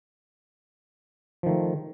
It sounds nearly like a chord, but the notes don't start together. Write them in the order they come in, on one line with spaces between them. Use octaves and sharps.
F3 D#3 A3